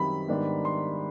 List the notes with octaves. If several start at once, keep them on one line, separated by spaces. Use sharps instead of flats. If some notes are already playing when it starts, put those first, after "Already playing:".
Already playing: F#2 D#3 G3 C4 B5
G#2 D#3 G3 B3 D4
C6